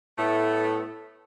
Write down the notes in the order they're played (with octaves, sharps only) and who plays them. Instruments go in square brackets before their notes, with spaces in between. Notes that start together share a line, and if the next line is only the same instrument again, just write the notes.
[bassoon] A2 [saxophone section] A3 B3